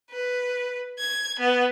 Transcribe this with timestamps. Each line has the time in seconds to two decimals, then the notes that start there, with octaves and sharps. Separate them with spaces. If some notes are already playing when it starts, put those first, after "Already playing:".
0.11 B4
0.99 G#6
1.40 B3